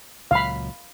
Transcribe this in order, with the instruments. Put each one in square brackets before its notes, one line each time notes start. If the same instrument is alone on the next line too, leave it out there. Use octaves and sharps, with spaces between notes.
[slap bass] C#2 A#2 F#3 [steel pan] F5 B5